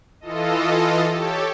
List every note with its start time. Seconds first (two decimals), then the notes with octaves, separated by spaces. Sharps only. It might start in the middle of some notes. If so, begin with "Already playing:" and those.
0.21 E3 F4 A4 D#5
1.12 G4 A4 C#5